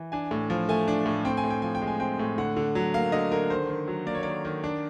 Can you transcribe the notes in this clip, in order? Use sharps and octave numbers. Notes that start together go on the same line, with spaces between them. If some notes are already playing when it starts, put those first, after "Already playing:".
Already playing: E3
D4 G#5
A2
F3
A3 G#5
D4
A2
C4 G5
G#5
A2
G5
F3 G#5
G5
G#3
G#5
C4 G5
A2
D3 F#5
D3
F#3
A#3 F5
D3 D#5
D3 A#4
D#3 C5
D#3
F#3
A#3 D5
C#5
D#3 D5
D#3
D4